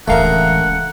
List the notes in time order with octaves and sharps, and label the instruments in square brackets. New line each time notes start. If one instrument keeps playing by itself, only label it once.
[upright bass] D1 E3 [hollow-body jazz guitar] C#2 F5 [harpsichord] A3 A#4 [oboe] F#5